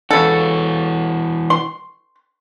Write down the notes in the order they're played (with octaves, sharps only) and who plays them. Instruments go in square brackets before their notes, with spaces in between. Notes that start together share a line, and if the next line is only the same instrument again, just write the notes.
[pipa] C#3 A4 [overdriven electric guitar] E3 F#4
[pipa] C6